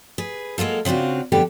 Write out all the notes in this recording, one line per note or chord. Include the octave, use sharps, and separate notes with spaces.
G#4 B4
F#3 G#3 A#3 F4 A4
C#3 C4 D4 F4 F#4
F2 D3 G3 B3 G4 A4